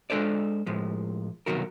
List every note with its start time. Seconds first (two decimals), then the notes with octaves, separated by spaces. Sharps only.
0.10 G#3 D4 A4 C5 D5
0.66 A2 F3 G#3
1.46 C2 B2 D#3 F#3 F#4 A#4